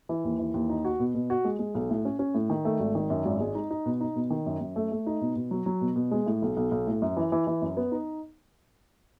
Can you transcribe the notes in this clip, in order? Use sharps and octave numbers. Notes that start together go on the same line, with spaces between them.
E3
D#2
E3
D#2
D#4
F#4
B2
B2
F#4
G#3
G#3
B1
A2
C#4
C#4
A2
D#3
A3
G#1
D#3
F#2
G#1
G#3
D#4
D#4
B2
D#4
B2
D#3
F#2
F#2
A3
A3
D#4
B2
B2
F#3
F#3
B2
B2
G#3
A2
B1
B1
B1
A2
F#2
E3
E3
E3
F#2
B3
D#4